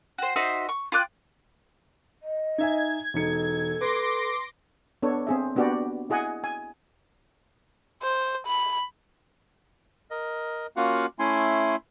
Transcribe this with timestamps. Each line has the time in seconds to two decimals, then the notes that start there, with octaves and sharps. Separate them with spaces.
0.18 F#4 C5
0.36 D#4 F#4 C5 E5
0.69 C#6
0.92 F4 G5 D6 F#6
2.23 D#5
2.58 D#4 E5 G#5 G#6
3.14 E1 D#4 A4 C#7
3.81 B4 C6 D6 A#6
5.03 B3 D4 A4 C#5
5.27 C4 G#4 E5
5.55 A#3 B3 D4 F#4 G4 D5
6.10 E4 G#4 D#5 F#5 G#5
6.44 G#5
8.03 C5
8.47 B5
10.11 A#4 D#5
10.77 A#3 C#4 F4 F#4 F5 F#5
11.19 A3 C#4 E4 G#5 C6